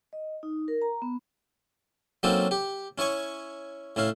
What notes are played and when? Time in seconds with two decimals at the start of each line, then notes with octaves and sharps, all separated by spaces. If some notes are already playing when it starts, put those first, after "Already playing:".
0.13 D#5
0.43 D#4
0.68 A#4
0.82 A#5
1.02 B3
2.23 F#3 A#3 C4 C#4 D#4 A4
2.51 G4
2.98 C#4 E4 C#5 G#5 C#6
3.96 A2 C#4 E4 F5